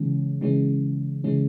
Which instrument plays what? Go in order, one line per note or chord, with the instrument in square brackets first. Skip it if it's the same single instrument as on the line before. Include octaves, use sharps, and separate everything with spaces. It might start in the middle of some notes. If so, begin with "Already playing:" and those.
Already playing: [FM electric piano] C#3 E3 G#3 C#4
C#3 E3 G#3 C#4
C#3 E3 G#3 C#4